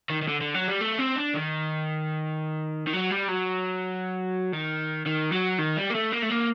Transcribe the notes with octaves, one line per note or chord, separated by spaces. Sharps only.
D#3
D#3
D3
D3
F#3
G3
A3
C4
D4
D#3
D#3
F#3
G3
F#3
D#3
D#3
F#3
D#3
G3
A#3
A3
A#3
A3
A#3